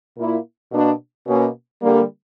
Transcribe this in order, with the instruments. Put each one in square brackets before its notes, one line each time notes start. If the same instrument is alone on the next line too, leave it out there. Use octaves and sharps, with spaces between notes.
[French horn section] A#2 A#3 E4
B2 A#3 D4
B2 A#3 C#4
D3 G3 A#3